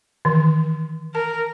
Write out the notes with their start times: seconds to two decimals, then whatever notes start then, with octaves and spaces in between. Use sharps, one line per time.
0.25 D#3 E3
1.15 A#4 A5